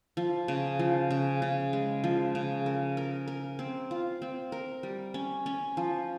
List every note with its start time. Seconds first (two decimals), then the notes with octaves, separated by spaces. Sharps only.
0.17 F3
0.48 C#3
0.79 F3
1.11 C#3
1.42 C#3
1.73 G#3
2.04 F3
2.35 C#3
2.66 A#4
2.97 A#4
3.28 A#4
3.59 C4
3.91 F4
4.22 C4
4.52 A#4
4.83 G3
5.14 C#4
5.46 C#4
5.77 F3